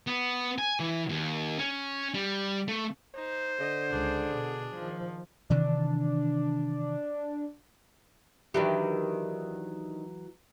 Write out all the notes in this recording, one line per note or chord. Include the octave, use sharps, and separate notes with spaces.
B3
G#5
E3
D#2
C#4
G3
A3
D#4 C5
D3 D#5
C#2 D4 G#4
B2
D#3 F3
C3 D#3 E3 D4
D#3 E3 F#3 D4 G4